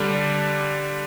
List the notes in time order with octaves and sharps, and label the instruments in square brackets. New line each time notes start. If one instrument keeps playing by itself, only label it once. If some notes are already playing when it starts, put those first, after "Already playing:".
Already playing: [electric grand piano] D3 G3 D4